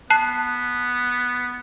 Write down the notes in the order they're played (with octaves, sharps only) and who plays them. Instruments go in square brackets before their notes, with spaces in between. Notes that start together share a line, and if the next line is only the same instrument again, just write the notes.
[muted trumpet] B3 [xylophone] A5 F#6 C7